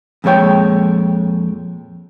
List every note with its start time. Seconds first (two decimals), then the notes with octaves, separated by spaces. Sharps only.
0.24 F2 A#2 G#3 C#5 G5